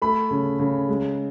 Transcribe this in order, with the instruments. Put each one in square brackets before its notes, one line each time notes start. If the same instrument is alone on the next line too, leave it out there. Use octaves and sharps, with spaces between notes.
[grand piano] A3 B5
C#3
C#3
G#3